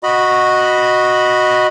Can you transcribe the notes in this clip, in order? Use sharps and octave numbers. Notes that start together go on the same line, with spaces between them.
F#4 D#5 B5